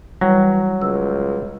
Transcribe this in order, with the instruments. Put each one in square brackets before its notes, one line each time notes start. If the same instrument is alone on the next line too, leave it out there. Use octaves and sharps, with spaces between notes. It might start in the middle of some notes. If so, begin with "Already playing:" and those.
[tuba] E3 [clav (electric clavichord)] F#3 [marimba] G3
[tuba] C#2 [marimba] E6